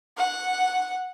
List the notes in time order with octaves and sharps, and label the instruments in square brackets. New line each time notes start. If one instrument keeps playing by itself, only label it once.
[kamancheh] F#5